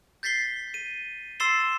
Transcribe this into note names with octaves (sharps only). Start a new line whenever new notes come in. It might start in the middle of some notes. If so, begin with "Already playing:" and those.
G6 A6 B6 C7 G7
D#7
C6 E6 A6 C7 E7 G7